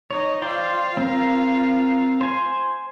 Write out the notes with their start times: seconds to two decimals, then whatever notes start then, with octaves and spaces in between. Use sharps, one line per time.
0.11 D#4 C#5 D#5
0.42 F4 C5 D5 F5 G5
0.97 C4 A#4
2.21 C5 G#5